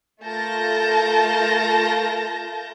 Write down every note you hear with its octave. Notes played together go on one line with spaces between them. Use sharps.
A3 F4 A#4 A5 G6 A#6